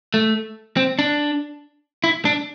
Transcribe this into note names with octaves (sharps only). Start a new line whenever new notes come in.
A3
C4
D4
E4
D4